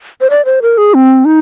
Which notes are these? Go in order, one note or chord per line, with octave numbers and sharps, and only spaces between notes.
C5
D5
C5
A#4
G#4
C4
D#4